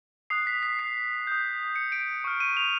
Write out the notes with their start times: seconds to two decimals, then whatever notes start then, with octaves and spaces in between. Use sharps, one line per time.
0.30 D#6 F#6 C7
0.47 B6
0.63 B6
0.79 C7
1.27 D#6 G6
1.76 C#7
1.92 D7
2.24 C#6 F6
2.40 D#7
2.57 F7